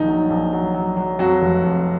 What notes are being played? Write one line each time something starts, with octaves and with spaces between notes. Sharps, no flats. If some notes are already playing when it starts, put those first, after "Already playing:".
Already playing: A#1 D#3 D#4
F#3
A#1
F#3
F#3
F#3
F2 F#3 F#4
F1
F2